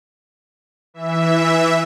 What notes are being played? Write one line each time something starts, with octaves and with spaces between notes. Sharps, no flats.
E3 E5